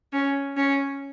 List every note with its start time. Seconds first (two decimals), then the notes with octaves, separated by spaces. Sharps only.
0.13 C#4
0.57 C#4